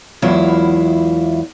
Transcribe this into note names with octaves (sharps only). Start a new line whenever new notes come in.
E2 F#3 G#3 E4 F4 F5